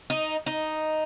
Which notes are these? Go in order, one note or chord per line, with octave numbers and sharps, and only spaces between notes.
D#4
D#4